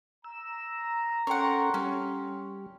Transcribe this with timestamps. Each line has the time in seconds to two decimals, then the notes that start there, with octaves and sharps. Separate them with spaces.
0.24 A#5 E6
1.27 C#4 A4 A#4 F#5 G5 C6 C#6
1.74 G3 C#4